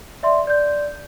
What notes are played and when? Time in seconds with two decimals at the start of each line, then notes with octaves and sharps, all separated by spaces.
0.23 D5 E5 C6
0.47 D5 G6